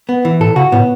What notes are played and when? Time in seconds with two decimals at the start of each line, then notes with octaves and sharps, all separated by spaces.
0.09 B3
0.25 E3
0.40 A2 A4
0.56 C#3 F#4
0.72 A2 B3